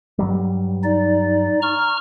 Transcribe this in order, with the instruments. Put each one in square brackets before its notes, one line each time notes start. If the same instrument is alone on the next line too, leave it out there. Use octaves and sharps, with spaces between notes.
[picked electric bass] G2 F#3 G3
[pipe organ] D#4 D5
A#5 C#6 F6